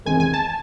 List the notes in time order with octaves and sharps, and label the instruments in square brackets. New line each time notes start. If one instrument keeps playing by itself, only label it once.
[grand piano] E2 C3 D#3 G#3 C4 [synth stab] G#5
[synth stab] G#5
A5